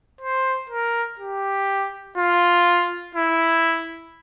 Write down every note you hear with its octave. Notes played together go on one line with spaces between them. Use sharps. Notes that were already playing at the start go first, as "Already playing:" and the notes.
C5
A#4
G4
F4
E4